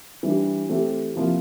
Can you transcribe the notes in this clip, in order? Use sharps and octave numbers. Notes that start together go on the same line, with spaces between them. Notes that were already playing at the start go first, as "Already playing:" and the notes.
E3 G3 D4
E3 A3 C4 G4
C3 F3 A#3 E4